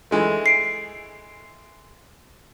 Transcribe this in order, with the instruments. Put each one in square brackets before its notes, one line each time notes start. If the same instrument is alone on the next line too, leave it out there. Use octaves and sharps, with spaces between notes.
[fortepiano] E3 G#3 A3
[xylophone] C7 D7